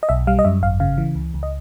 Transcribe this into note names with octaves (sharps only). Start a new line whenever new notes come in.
D#5
B1 E5
G3 F5
D#5
F#2 E5
G#1 F5
C#3 F5
E3
C#2
C#2
D#5